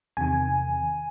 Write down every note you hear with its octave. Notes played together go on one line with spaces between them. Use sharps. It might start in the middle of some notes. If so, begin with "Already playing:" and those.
E2 C3 D#3 G#5